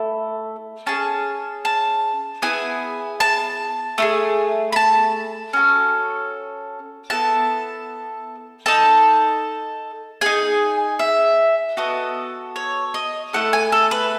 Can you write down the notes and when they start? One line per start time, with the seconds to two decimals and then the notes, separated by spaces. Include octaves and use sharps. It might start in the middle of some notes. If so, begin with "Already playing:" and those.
Already playing: A3 E4 A4
0.86 C#4 G#4 A5
1.65 A5
2.42 B3 E4 G#4 G#5
3.20 A5
3.98 A3 E4 G#4
4.72 B5
4.76 A5
5.53 C#4 F#4 A4
7.10 B3 E4 A4 A5
8.66 D#4 A4 A5
10.21 D#4 G#4 G#5
10.99 E5
11.77 B3 F#4 A4 D#5
12.56 C#5
12.94 D#5
13.33 A3 E4 A4 F#5
13.53 G#5
13.72 A4
13.91 B4